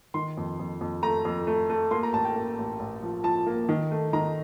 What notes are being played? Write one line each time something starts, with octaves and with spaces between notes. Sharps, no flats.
D#3 C6
F2
F2
F2
A3 A#5
F2
A3
A3
A#3 C6
A#5
A1 A5
G5
A#3
A1
A1
F3
F3 A5
A#3
D#3
A3
D#3 A#5